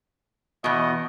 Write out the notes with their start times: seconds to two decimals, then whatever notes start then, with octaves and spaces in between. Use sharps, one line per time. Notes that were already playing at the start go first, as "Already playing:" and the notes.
0.64 E2 B2 D#5